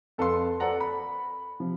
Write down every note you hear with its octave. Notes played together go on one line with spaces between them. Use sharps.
F2 A4 B4 F5 A5 C6
A4 C5 D5 F#5 A#5
B5
C3 F3